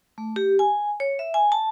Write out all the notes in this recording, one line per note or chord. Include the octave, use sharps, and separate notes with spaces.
A3
G4
G#5
C#5
E5
G#5
A5